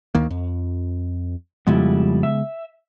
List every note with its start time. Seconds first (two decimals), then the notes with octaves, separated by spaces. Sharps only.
0.15 D2 D#3 A#3
0.30 F2
1.67 F2 C#3 G3 G#3 B3 E4
2.23 E5